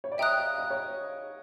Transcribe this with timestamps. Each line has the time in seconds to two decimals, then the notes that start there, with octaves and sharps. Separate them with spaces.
0.04 C#5
0.12 D5
0.18 D#5 E5 G5 A#5 D#6 F#6
0.38 F5
0.58 D#5
0.70 C#5